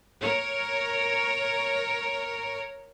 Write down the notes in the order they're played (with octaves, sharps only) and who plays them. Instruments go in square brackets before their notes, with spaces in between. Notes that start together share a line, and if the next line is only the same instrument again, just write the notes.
[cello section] A#4 C#5